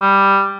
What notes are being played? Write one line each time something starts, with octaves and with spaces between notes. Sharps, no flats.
G3